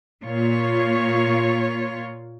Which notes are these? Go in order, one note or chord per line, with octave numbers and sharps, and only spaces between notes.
A#2 F4 C#5